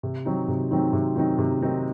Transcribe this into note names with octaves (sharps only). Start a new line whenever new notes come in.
C3
D#3 F#3 C4 D#4
C3
D#3 F#3 C4 D#4
C3
D#3 F#3 C4 D#4
C3
D#3 F#3 C4 D#4